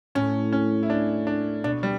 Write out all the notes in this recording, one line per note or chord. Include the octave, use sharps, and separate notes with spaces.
A2 C#4
C#4
E4
D4
D4
B2 D4
G3